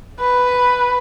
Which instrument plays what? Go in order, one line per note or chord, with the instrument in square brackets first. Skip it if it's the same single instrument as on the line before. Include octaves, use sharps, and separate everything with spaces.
[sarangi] B4